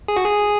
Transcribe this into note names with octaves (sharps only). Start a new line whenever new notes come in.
G#4
F#4
G#4